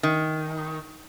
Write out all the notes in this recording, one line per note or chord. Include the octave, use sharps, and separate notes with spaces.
D#3